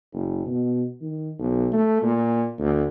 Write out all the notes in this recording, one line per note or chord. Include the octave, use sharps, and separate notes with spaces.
F#1
B2
D#3
B1
A3
A#2
D2